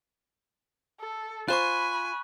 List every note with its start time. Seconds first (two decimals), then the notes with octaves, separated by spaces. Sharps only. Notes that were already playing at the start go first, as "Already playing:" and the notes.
1.00 A4
1.48 F4 C5 G#5 B5 C#6 F#6